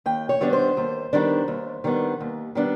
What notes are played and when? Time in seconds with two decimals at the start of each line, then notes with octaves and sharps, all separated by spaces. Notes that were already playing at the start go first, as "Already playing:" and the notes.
0.06 D#2 G5
0.29 C#5
0.41 D#3 G3 B3 D4
0.53 C5
0.77 D#2
1.13 D#3 G3 B3 D4
1.48 D#2
1.84 D#3 G3 B3 D4
2.20 D#2
2.55 D#3 G3 B3 D4